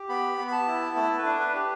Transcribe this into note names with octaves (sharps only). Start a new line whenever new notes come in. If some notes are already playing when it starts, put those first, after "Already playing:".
Already playing: G4
B3 B5
B3
B5
A5
E4
A3 A5
B4
D4
B4
G4